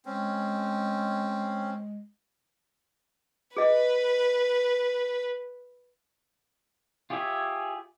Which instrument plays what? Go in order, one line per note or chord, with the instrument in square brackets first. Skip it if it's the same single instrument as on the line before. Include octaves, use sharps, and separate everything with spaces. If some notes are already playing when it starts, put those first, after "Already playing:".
[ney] G#3 [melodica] C4 C#4
[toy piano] G#4 D#5 [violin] B4
[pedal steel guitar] F4 G4 G#4 C#5 E5